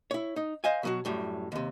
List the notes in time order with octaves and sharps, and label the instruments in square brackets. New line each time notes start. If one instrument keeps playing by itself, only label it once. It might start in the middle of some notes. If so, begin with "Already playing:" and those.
[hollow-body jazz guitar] E4 C#5
D#4
C5 D#5 F5 G#5
B2 F#3 F#4
F#2 A2 G3
D#2 C3